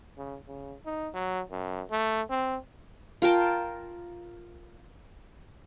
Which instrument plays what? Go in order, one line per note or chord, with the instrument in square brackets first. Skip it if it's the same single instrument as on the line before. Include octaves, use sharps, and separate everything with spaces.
[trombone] C#3
C#3
D#4
F#3
F#2
A3
C4
[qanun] F4 A#4 G5 A5